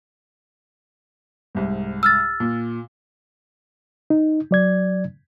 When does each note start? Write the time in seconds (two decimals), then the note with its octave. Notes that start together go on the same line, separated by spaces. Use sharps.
1.55 C2 G#2
2.03 E6 F6 A6
2.40 A#2
4.10 D#4
4.51 F#3 D5 G#6